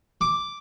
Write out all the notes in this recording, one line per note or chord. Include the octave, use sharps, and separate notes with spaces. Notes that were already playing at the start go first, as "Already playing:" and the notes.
D6